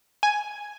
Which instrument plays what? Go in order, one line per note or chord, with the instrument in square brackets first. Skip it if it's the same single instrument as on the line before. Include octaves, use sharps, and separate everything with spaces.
[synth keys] G#5